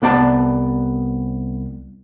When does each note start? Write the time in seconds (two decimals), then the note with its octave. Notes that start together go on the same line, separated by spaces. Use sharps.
0.02 C2 B3 D5 A5